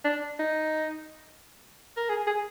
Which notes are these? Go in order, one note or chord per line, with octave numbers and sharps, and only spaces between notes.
D4
D#4
A#4
G#4
G#4